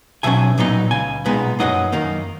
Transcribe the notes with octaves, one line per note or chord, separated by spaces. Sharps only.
B1 B2 F#3 C#4 E5 G#5
A#2 F#3 B3 D#4
C#2 C#3 G#5
B1 A#2 G#3 B3 D#4
F#2 C#3 F#3 A#3 D#4 D#5 F#5
F#2 D#3 A#3 D#4